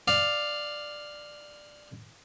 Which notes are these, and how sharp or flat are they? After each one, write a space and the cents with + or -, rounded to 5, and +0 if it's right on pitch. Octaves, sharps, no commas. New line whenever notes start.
D5 +10 F5 +0